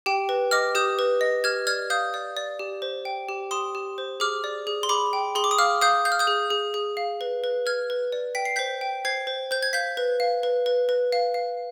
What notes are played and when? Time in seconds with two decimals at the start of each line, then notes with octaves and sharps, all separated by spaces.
0.06 G4 G5
0.29 B4
0.51 D#5 D6 F6
0.75 G4 D#6 G6
0.99 B4
1.21 D#5
1.44 G4 F6 G#6
1.67 D5 F6 G#6
1.90 F5 D#6 G6
2.14 D5
2.37 D5
2.59 G4
2.82 C5
3.05 G5
3.29 G4
3.51 G4 C6 D#6
3.75 G4
3.98 C5
4.20 G#4 D6 F6
4.44 D5
4.67 G#4
4.83 C6
4.89 G#4 B5 D6
5.13 G5
5.35 G#4 C6
5.44 D6
5.51 D#6
5.58 F5 D6 F6
5.81 F5 D#6 G6
6.05 F5 G6
6.12 F6
6.19 D#6 G6
6.27 G#4
6.50 G#4
6.74 G#4
6.97 F5
7.21 B4
7.44 B4
7.66 B4 F6 G#6
7.90 B4
8.12 D5
8.35 G5 B6
8.45 C7
8.56 C5 G6 B6
8.81 G5
9.05 C5 G#6 C7
9.27 C5
9.51 C5 G6
9.63 G#6
9.73 F5 G6 B6
9.97 B4
10.20 F5
10.43 B4
10.66 B4
10.89 B4
11.12 F5
11.34 F5